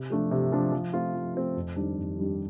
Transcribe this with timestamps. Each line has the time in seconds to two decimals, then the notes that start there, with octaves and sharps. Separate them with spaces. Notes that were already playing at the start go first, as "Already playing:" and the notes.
Already playing: C3
0.10 F3 A3 D4
0.31 C3
0.52 F3 A3 D4
0.72 F3
0.93 A3 C4 F4
1.15 F3
1.35 A3 C4 F4
1.56 F2
1.76 D#3 G3 D4 G4
1.97 F2
2.18 D#3 G3 D4 G4